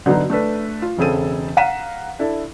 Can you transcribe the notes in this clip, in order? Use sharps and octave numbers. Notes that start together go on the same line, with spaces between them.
D3 F#3 B3 D#4
A3 D4 A4 B4
F4
E1 C#3 C4 G#4 A4 D#7
F5 F#5 A#5 B6 D#7 E7
D4 E4 A4